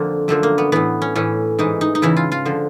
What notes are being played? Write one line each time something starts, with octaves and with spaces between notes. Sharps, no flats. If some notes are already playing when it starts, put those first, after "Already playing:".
Already playing: F2 D3 F3 A#3
F#2 D3 F3 A3
A#3
B3
A2 E3 B3
C#4
A2 E3 C#4
G#2 E3 D#4
D#4
D#4
E2 C#3 E3 E4
F4
F4
D3 F3